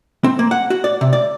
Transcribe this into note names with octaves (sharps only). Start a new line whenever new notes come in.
C4
A#3
F#5
F#4
D5
C3
D5